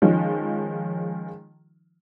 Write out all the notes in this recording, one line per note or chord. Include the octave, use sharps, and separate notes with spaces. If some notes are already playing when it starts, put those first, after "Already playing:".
D#3 F3 G#3 C#4